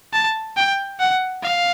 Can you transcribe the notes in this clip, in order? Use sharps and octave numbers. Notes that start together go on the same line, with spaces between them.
A5
G5
F#5
F5